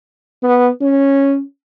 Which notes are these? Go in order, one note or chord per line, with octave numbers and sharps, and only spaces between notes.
B3
C#4